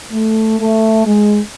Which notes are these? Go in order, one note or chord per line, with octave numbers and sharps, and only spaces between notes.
A3
A3
G#3